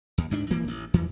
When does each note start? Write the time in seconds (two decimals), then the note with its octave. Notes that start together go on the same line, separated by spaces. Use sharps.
0.18 D#2
0.30 D2 G#2 G#3 D4
0.51 D#1 E3 A#3
0.68 A1
0.94 E2 E3